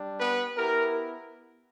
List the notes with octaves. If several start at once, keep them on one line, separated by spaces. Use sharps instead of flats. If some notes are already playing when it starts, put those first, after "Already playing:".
Already playing: G3 D4
B3 B4
B3 E4 G4 A#4